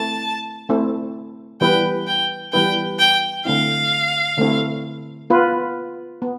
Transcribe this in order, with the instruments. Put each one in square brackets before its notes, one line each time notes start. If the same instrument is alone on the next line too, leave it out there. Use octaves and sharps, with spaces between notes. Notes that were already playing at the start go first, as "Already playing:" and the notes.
Already playing: [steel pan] A3 C4 E4 [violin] A5
[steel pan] A3 C4 E4
[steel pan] E3 G3 B3 E4 B4 [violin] G5
[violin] G5
[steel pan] E3 G3 B3 E4 B4 [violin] G5
[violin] G5
[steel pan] D3 A3 C4 E4 [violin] F5
[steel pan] D3 A3 C4 E4
B3 F4 B4
B3